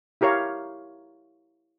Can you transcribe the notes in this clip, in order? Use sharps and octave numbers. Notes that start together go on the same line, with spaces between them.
E4 G4 A#4 C#5 F5